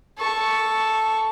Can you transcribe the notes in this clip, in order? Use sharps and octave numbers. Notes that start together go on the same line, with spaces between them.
A4 C#6